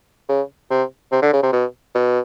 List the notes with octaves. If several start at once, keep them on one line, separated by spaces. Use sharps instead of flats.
C#3
C3
C3
D3
C#3
C3
B2
B2